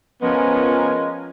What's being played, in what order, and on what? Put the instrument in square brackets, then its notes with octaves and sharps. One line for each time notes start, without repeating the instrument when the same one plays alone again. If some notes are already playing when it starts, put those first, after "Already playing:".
[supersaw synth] F3 A#4 G#5 [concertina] G#3 [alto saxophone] B3 [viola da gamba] C#4